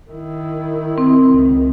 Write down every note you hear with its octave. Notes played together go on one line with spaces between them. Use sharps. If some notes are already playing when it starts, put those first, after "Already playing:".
D#3 E4
C4
C#2 D#3